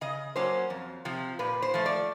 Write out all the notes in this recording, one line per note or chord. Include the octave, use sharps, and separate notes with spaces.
C#3 D#5
F#3 A#3 C#4 C5
F2
C3 F3
A#2 B4
C5
F3 A3
D5